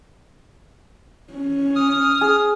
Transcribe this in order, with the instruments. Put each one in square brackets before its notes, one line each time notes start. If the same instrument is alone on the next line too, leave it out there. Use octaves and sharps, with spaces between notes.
[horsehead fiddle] C#4
[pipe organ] D#6 F6
[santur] G#4